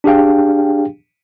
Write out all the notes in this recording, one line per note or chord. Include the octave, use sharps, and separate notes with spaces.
D4 G4 G#4 F5 G5